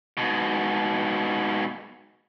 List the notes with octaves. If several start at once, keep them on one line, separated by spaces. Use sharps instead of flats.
G#2 B2